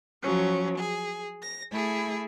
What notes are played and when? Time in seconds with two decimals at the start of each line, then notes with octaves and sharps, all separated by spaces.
0.22 F3 F#3 C#4
0.78 G#4
1.42 A#6
1.73 A3 E4 G#4